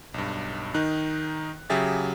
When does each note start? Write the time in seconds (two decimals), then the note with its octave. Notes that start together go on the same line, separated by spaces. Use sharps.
0.14 B1 G2
0.74 D#3 D#4 F#6
1.70 C#3 F#3 G4 G#4 E5 A6